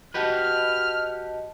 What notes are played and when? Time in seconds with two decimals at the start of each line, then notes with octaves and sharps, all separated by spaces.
0.14 F#4 G4 B4 D#5 A5 F6